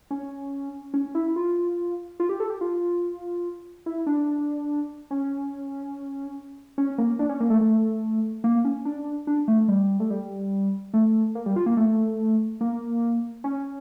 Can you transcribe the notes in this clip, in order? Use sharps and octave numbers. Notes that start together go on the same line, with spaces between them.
C#4
C#4
E4
F4
F4
G4
A4
G4
F4
E4
D4
C#4
C#4
A#3
D4
C#4
A#3
A3
A3
A#3
C#4
D4
D4
A3
G3
A3
G3
A3
A#3
G3
F4
A#3
A3
A#3
C#4